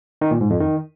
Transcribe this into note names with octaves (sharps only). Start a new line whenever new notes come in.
D#3
A#2
G#2
F2
D#3